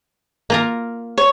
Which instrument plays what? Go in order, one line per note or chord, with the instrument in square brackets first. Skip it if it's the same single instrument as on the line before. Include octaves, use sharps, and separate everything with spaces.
[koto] A#3 F4 A#4
[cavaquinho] C#5